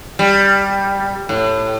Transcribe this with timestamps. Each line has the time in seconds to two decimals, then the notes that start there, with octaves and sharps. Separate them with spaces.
0.19 G3
1.29 A2